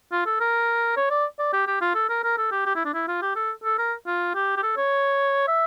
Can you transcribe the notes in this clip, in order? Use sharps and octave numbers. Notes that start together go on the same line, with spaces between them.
F4
A4
A#4
C#5
D5
D5
G4
G4
F4
A4
A#4
A#4
A4
G4
G4
E4
D4
E4
F4
G4
A4
A4
A#4
F4
G4
G4
A4
C#5
E5